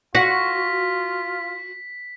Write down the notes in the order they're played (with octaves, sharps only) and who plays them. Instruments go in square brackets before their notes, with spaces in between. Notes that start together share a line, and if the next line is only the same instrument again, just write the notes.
[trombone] F4 [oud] F#4 [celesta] A#6 [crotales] B6